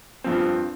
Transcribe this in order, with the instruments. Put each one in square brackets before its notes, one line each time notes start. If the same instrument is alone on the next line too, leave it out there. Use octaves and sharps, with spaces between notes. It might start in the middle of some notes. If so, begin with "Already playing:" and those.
[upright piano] G2 F3 C4